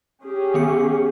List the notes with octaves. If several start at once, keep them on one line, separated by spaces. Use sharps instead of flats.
C#4 G4 G#4
D#3 B3 C#7